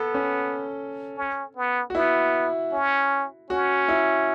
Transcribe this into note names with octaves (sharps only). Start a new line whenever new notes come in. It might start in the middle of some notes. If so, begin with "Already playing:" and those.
Already playing: B3 A4
C#4
C#4
B3
F#4
B3 E4
C#4
C#4 F#4
E4